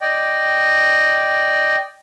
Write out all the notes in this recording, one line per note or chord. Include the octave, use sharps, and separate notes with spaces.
D5 D#5 G5